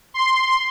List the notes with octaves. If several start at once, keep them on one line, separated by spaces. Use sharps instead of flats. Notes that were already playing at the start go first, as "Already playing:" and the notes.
C6